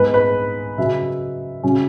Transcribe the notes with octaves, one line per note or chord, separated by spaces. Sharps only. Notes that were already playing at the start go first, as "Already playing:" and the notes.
Already playing: G#2 G#3 B3 B4
B4
C#3 F#3 C#4 E5
C#3 F#3 C#4